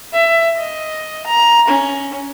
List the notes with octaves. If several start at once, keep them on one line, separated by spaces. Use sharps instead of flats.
E5
D#5
A#5
C#4